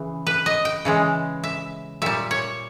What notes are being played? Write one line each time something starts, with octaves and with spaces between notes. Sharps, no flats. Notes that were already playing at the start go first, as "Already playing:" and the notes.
Already playing: C#3 E3
B4
D#5
G5
C#3 E3 G#3
E5
A#2 G3 E5
C#5